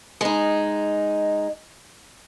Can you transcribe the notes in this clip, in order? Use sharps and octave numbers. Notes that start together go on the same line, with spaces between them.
G#3 D#4